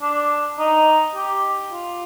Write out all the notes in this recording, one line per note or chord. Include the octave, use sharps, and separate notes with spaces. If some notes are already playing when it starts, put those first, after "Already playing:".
D4
D#4
G4
F4